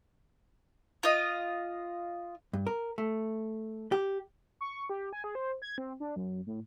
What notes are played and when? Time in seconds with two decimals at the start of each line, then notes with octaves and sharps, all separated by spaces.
1.03 F4 D#5
2.53 G2
2.67 A#4
2.98 A3
3.92 G4
4.61 C#6
4.90 G4
5.13 G#5
5.24 G#4
5.35 C5
5.62 G#6
5.78 C4
6.00 D4
6.16 F#2
6.47 A2